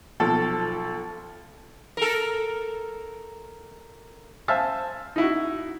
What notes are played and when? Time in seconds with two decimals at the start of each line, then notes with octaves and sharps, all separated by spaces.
0.20 B1 F3 A4
1.97 A4 A#4
4.48 C5 E5 F5 G#5 A5
5.16 D#4 E4 F#4